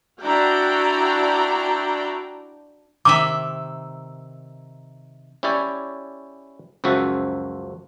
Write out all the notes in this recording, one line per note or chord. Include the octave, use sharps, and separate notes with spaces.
D4 E4 F#4 D5 G5 A#5
C3 D#3 E5 D6
C#4 E4 G4 C#5 D5
C#2 F#2 F3 F#4 E5